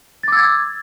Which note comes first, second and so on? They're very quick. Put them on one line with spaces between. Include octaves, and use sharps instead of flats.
A6 D6 E6 G#6